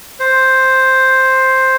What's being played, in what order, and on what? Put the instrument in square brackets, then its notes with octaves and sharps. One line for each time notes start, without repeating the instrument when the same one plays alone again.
[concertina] C5